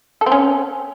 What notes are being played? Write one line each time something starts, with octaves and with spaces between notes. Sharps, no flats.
A4
C4
C#4